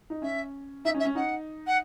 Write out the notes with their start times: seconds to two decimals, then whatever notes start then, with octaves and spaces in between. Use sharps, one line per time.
0.10 D#4
0.22 C#4 E5
0.85 D#4 E5
0.94 C#4
0.99 E5
1.05 C#4
1.15 D#4 F#5
1.67 F#5